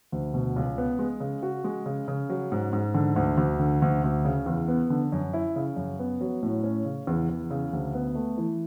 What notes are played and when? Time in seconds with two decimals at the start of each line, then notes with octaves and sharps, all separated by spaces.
0.12 D2
0.34 B2
0.56 C#2
0.78 B3
0.99 G#3
1.20 C#3
1.43 F#4
1.64 G#3
1.86 C#3
2.08 C#3
2.29 F#3
2.52 G#2
2.73 G#2
2.94 D3
3.16 D2
3.37 D2
3.59 D3
3.82 D2
4.04 D2
4.25 C#3
4.46 E2
4.68 B3
4.90 D3
5.12 F#2
5.34 E4
5.56 C#3
5.76 F#2
5.99 B3
6.21 F#3
6.43 A2
6.63 C#4
6.85 C#3
7.07 E2
7.29 E2
7.51 C#3
7.73 D2
7.94 B3
8.15 A3
8.38 E3